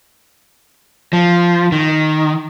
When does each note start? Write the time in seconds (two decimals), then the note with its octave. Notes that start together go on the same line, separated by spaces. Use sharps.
1.13 F3
1.72 D#3